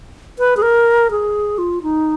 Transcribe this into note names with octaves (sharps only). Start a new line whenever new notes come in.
B4
G#4
A#4
G#4
F4
D#4